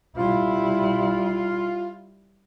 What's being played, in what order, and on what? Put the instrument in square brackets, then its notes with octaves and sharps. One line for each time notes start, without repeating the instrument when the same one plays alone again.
[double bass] G3 E4 [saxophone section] F4